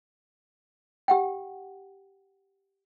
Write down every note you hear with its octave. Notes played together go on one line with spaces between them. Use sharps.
G4 F#5 G5